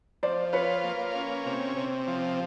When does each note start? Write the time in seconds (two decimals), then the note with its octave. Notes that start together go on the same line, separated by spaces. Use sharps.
0.23 F3 C5 D5
0.53 F4 B4 C#5
0.84 A#3
1.15 C#4
1.46 C3
1.77 C3
2.07 F3